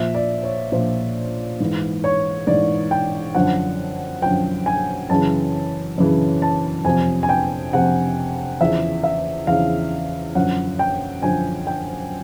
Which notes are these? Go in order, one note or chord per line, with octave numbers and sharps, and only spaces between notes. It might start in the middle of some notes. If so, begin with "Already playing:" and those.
Already playing: A#2 F3 E5
D5
C#5
A#2 F3 C5
G#2 E3
C#5
G#2 E3 D5
G5
F#2 D3 F3 F#5
F#2 D3 F3 G5
G#5
F#2 C#3 E3 A5
F#2 C#3 E3
A5
F2 C3 F3 G#5
G#5
G5
F2 C3 F3 F#5
E2 C#3 F3 E5
E5
E2 C#3 F3 F5
F#2 D3 F3 F#5
G5
F#2 D3 F3 G#5
G5